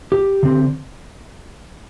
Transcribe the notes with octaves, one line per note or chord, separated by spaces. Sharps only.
G4
D3 C4